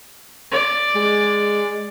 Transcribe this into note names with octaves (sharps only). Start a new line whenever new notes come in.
D5
G#3